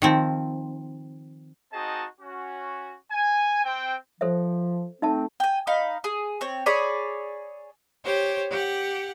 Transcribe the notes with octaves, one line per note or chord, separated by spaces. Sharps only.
D#3 F3 C4
C4 D#4 F#4 G#4 D#5 A5
C#4 F#4
G#5
C4 C5 G5
F3 A4 C5 E5
A3 C4 D#4 E5 A5
G5 G#5
D#4 F5 B5
G#4
C4 C#5
G#4 C#5 D5 B5
G4 C5 C#5
G4 F#5